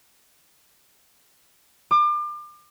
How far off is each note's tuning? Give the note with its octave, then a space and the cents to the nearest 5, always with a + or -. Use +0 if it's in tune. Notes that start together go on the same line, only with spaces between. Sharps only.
D6 +35